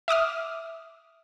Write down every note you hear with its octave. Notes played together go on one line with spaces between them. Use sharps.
E5 D6 D#6 F6